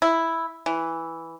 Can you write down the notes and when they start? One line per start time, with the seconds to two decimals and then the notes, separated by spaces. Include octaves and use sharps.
0.02 E4
0.66 E3